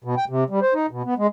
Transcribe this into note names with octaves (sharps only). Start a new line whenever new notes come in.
B2
G5
C3
G3
C5
D#4
B2
B3
G#3